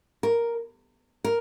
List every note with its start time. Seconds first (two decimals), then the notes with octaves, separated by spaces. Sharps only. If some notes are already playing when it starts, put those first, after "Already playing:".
0.23 A#4
1.24 A#4